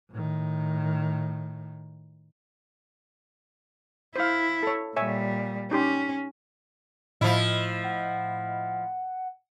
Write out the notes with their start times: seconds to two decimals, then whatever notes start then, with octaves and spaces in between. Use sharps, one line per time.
0.12 A2 D#3
4.16 E4 C5 F5
4.63 A4 C#5
4.97 A#2 G3 C#5 E5 G#5
5.71 C#4 D#4 G4 C6
7.21 A2 F3 E4 D#5 B5
7.84 F#5